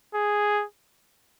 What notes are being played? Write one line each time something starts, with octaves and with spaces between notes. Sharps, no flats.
G#4